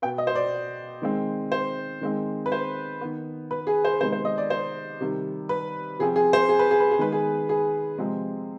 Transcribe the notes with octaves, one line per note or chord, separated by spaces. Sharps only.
B2 B3 G5
D#5
C5
D5
D#3 G#3 C4
C5
D#3 G#3 C4
B4
C5
D#3 B3
B4
G#4
C5
C3 D#3 G#3 B3 C5
C5
D#5
D5
C5
C3 D#3 G3
B4
C3 F3 C4 G#4
G#4
C5
G#4
B4
G#4
B4
G#4
D#3 G#3 B3 B4
G#4
G#4
C3 F3 G#3 C4